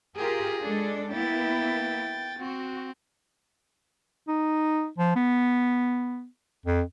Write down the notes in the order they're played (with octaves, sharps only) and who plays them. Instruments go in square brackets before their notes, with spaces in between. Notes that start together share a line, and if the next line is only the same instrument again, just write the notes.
[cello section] F4 G4 A#4 [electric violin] G#4
[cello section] G#3 D4 A4
[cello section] A#3 B3 E4 [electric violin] G5 A6
[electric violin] C4 [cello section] F#4
[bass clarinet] D#4
F3
B3
F2